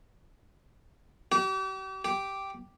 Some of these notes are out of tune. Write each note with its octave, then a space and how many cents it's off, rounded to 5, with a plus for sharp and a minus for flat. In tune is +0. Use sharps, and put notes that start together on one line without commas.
G4 -40
G4 -5